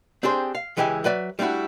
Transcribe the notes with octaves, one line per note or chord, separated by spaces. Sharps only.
C4 D4 G4 G#4 C5
F5
C#2 E3 G#3 G4 E5 G#5
F#3 B4 D5 E5
G3 A3 D4 E4 F#4